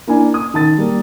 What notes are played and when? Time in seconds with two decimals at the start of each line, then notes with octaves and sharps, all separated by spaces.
0.07 A#3 D4 E4 G#5
0.34 D#6
0.54 D#3 A5 A6
0.78 G3 A#3